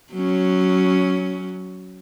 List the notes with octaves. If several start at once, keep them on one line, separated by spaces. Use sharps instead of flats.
F#3 C#4